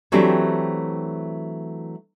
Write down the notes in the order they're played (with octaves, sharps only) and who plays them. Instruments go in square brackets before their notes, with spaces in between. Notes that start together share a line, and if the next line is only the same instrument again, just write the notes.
[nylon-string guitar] E3 F#3 A3 C4 D4 G4